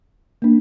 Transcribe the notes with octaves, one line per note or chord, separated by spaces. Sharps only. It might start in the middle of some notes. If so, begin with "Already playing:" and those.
A#3 D4